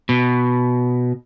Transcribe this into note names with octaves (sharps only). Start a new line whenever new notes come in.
B2